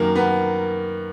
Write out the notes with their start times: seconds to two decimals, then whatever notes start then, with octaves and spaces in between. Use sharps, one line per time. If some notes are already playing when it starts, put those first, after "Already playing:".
Already playing: F#2 D#3 A#3
0.15 B3